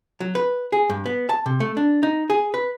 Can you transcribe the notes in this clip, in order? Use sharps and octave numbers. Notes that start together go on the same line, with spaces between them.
F#3
B4
G#4
G2
B3
A5
C3
A3
D4
D#4
G#4
B4